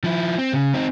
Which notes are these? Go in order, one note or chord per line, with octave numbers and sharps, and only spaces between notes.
F3 E4
C4
C#3
C4 D#4